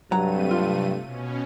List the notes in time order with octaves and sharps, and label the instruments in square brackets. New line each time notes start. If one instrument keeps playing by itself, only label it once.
[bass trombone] G2 [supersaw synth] C3 A3 D#7 [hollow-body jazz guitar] F#3 [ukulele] A#5
[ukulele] F4
[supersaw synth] B2 C#4